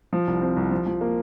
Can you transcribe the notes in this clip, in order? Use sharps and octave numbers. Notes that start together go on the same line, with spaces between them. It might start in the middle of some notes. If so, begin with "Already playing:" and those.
F3
C2
C4
C2
F3
F3
A#3